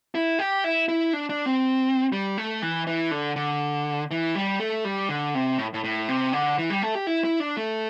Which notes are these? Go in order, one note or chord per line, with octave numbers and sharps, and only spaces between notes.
E4
G4
E4
E4
D4
D4
C4
G3
A3
E3
E3
D3
D3
E3
G3
A3
G3
D3
C3
A2
A2
A2
C3
D3
E3
G3
A3
G4
E4
E4
D4
A3